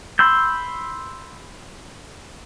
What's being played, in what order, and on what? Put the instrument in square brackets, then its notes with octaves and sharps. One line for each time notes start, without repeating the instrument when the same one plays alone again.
[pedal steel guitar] B5 C6 E6 G6